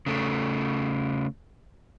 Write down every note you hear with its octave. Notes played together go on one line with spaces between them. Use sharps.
C#3 A3